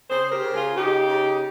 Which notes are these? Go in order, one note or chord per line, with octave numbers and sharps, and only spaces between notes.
C#3 G#4 C5
G4 A#4
C#3
F4 G#4
C#3 D#4 G4
C#3